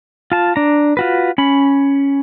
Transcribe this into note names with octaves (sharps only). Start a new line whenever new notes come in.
F4 A5
D4 A#5
F4 F#4 B4
C#4 B5